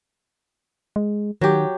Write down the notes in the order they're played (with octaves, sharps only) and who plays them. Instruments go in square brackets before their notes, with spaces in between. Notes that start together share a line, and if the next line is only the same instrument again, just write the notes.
[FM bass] G#3
[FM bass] D#3 [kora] F#3 G4